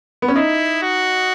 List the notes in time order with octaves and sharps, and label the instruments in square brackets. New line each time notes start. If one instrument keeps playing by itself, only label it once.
[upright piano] B3
C#4
[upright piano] D#4 [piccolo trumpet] E4
[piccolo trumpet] F#4